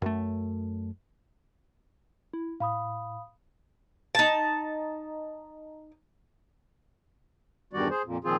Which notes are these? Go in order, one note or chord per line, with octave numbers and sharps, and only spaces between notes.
F#2 A3
E4
A2 F5 B5 D#6
D#4 A5
E2 G2 D#3 G3 F#4 D5
G#4 C5
F2 A#2
A#2 D#3 F3 C4 F4 G#4